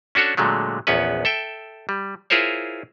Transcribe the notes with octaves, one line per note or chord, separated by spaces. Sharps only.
C#4 D4 F#4 A4 C#5
A#2 D3 F#3 G#3 A3
A#1 E2 B3 C#4 B4
A4 E5 G5
G3
E4 F4 G#4 A#4 C5 C#5